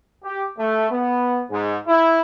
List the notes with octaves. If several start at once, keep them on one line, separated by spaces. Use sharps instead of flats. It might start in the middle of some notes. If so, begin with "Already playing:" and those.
G4
A3
B3
G#2
E4